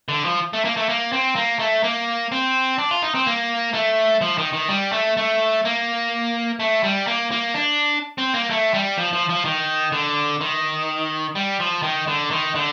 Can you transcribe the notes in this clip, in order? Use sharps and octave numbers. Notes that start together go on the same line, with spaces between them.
D3
F3
A3
A#3
A3
A#3
C4
A#3
A3
A#3
C4
D4
F4
D#4
C4
A#3
A3
F3
D#3
D#3
G3
A3
A3
A#3
A3
G3
A#3
A#3
D4
C4
A#3
A3
G3
F3
F3
F3
D#3
D3
D#3
G3
F3
D#3
D3
D#3
D3